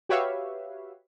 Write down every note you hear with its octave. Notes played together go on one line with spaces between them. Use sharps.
F#4 G4 B4 C#5 E5 F5